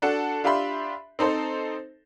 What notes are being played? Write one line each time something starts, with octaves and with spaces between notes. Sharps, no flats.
D4 F#4 A4 F#5 A5
D4 F4 G4 E5 B5 C6
C4 D#4 A4 C5